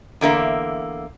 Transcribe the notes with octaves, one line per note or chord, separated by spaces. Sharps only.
E2 D3 A#3 E5